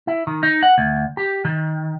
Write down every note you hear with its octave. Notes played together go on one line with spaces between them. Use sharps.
E4
D#3
D#4
F#5
D2
G4
D#3